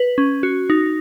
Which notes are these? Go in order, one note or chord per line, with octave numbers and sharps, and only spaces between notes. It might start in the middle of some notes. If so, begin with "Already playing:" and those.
Already playing: B4
C#4
F#4
D#4